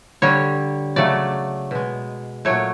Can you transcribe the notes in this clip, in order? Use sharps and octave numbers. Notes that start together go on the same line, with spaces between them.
D3 G3 C#5
C#3 F#3 A3 D5
B2 G#3
A#2 F#3 A3 C#5